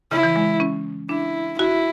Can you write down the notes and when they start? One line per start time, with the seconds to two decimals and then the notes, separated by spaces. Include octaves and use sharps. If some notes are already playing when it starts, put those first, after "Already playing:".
0.11 C#3 E4
0.23 E3
0.36 G#3
0.60 C#4
1.09 D4 E4
1.59 E4 F#4